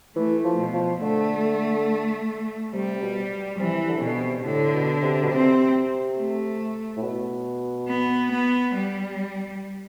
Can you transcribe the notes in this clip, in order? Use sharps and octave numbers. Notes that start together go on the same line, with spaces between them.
E3 A3
F3
B2
F3
D3 A3
C3 G3
C3
B2
C3 E3
D3
C3
B2 D3
C3
A2 D3
B2
C3
B2
C3 C4
A3
A2
B2
B3
B3
G3